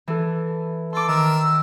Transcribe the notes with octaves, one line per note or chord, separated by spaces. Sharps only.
E3 A4
A4 C6 D6
D#3 A#4 E6